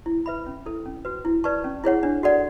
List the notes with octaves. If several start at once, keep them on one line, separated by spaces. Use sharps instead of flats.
E4
B4 E5 B5
C#4
E4 A4
C#4
F#4 B4
E4
B4 D5 A5 C#6
C#4
E4 G#4 C#5 F#5
D4
F#4 A4 D5 F#5